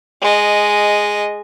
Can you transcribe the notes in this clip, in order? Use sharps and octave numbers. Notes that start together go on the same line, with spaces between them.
G#3 D#5